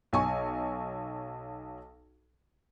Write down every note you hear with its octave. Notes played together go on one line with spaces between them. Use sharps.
B1 G#5 C#6